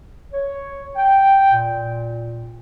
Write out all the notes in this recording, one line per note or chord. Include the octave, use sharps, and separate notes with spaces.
C#5
G5
A#2